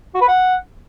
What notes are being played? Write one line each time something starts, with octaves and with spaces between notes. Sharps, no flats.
F#4
B4
F#5